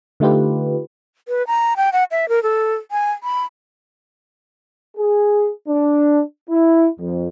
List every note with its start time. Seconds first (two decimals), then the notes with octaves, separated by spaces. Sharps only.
0.20 D3 A3 D#4 F4 G4 B4
1.28 B4
1.47 A#5
1.77 G5
1.93 F#5
2.11 E5
2.29 A#4
2.43 A4
2.91 G#5
3.23 B5
4.97 G#4
5.68 D4
6.48 E4
6.99 F2